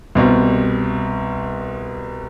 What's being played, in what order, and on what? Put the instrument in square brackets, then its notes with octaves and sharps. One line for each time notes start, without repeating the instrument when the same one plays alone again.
[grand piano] C2 B2 G3 C4